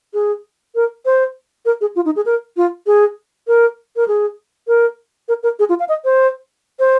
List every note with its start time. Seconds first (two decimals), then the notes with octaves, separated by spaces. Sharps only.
0.14 G#4
0.75 A#4
1.05 C5
1.65 A#4
1.81 G#4
1.96 F4
2.05 D#4
2.16 G#4
2.26 A#4
2.57 F4
2.86 G#4
3.47 A#4
3.96 A#4
4.08 G#4
4.68 A#4
5.28 A#4
5.43 A#4
5.59 G#4
5.69 F4
5.79 F5
5.89 D#5
6.05 C5
6.79 C5